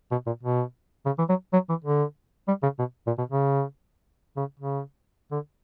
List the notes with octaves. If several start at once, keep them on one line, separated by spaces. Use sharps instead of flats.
B2
A#2
B2
C#3
E3
F#3
F#3
E3
D3
G3
C#3
B2
A#2
B2
C#3
C#3
C#3
D3